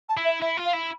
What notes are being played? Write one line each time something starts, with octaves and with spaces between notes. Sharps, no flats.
A5
E4
E5
E4 E5
F4
F5
E4